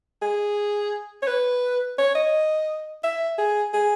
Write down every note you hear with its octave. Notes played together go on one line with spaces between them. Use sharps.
G#4
C#5
B4
C#5
D#5
E5
G#4
G#4